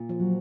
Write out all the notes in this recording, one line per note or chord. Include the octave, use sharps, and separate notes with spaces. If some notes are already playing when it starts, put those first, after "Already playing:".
Already playing: A#2
F3
F#3